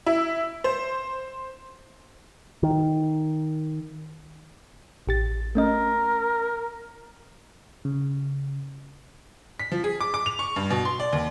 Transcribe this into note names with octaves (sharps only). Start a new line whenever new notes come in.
E4
C5
D#3
A1 G4 A6
A3 C#4 A#4 D#5
C#3
B6
F3
G#4
D6
D6
F7
C#6
G2
B2
C6
D5
D#2